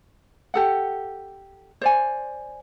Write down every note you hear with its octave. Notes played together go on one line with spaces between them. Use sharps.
G4 A4 F#5
C5 D5 G#5